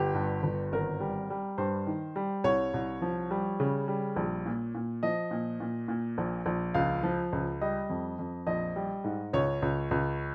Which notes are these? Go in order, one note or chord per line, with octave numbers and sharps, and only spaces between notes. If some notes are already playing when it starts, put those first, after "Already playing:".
Already playing: G1 G4
G2
G1
G#1 A#4
G3
G3
G2 C5
D#3
G3
C2 C#5
C2
F3
G3
C#3
G3
A#1
A#2
A#2
F3 D#5
A#2
A#2
A#2
A#1
A#1
C#2 F5
F3
C#2
G3 D#5
F2
F2
A#1 D#5
G3
G#2
C#2 C#5
C#2
C#2